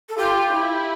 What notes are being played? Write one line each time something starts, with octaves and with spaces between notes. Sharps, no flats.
A4
F4 G4
E4